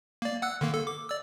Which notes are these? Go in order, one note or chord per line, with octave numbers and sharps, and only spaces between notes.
A#3 D5
F#5 E6 F#6
D3 D#3 A#3
A4
D6
D5 E6